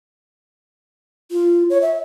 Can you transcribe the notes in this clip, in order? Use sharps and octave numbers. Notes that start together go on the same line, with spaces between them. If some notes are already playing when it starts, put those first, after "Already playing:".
F4
C#5
E5